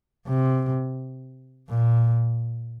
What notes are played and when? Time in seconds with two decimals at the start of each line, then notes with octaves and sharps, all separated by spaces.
0.28 C3
1.69 A#2